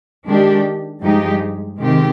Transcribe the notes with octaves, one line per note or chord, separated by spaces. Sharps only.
D#3 G#3 D4 G4
G2 F3 G#3 D#4 G4
C3 D#3 G#3 C4 G4